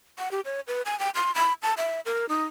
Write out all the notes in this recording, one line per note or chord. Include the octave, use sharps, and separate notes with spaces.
F#5
G4
C#5
B4
G#5
G5
C6
B5
A5
E5
A#4
D#4